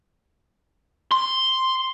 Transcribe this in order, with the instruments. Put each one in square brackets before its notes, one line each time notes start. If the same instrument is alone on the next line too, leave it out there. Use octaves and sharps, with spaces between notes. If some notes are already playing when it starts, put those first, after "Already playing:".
[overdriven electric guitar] C6